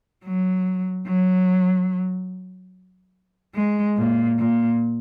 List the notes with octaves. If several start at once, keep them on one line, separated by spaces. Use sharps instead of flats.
F#3
F#3
G#3
A#2
A#2